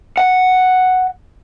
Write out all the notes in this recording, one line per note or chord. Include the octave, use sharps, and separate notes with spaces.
F#5